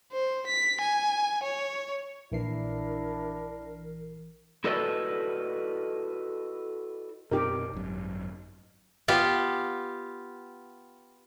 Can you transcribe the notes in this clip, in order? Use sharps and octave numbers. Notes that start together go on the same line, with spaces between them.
C5
B6
G#5
C#5
A#1 E3 D4 E4 A#4 C7
E4 F#4 A4 B4 D5 D#5
F#2 B2 C4 D#4 G4 A#4
G#1 F#2
B3 F4 G4